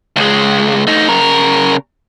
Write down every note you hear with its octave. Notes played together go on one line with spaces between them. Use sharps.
C#2 G#3
A3 D#4
C#3 A#4